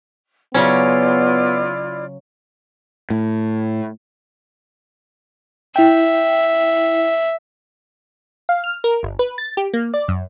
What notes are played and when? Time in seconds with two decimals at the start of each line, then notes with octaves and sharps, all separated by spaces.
0.54 C#3 F#3 B3 C#4 E4 F4 D5
3.10 A2
5.76 E4 E5 G5
8.49 F5
8.64 F6
8.84 A#4
9.03 G1
9.19 B4
9.38 A6
9.57 G4
9.74 A#3
9.94 D5
10.08 F#2